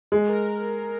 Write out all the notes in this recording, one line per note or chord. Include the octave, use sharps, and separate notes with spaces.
G#3
A#4